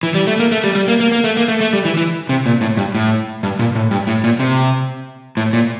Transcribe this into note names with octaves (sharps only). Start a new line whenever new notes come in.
E3
G3
A3
A#3
A3
G3
G3
A#3
A#3
A#3
A3
A#3
A3
A3
G3
E3
E3
C3
A#2
A2
G2
A2
G2
A#2
A2
G2
A2
A#2
C3
A2
A#2